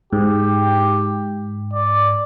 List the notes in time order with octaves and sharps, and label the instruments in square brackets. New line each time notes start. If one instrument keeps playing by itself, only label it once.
[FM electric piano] G#2 [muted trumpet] G4
[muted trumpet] D5